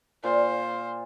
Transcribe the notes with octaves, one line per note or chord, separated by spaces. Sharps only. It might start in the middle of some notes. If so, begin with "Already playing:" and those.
A#2 C5